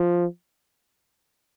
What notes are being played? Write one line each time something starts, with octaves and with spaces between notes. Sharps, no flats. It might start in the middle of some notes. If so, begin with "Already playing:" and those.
Already playing: F3